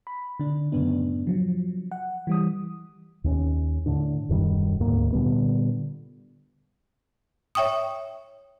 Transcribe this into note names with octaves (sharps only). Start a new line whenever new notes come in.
B5
D3 D4
F#2 A2 C#3 B3 D4
F3 F#3
F#5
E3 G3 D#6
D#2 C4 C#4
A2 D3 D4
D#1 F#2 D#3 G3
D2 G#2 A#3
A#2 D3 G3 B3
C#5 E5 G5 C#6 D#6